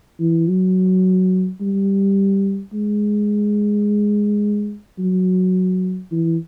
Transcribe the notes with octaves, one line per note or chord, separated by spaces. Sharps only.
E3
F#3
G3
G#3
F#3
E3